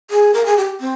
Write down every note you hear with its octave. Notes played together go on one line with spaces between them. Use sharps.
G#4
A#4
G#4
G4
C4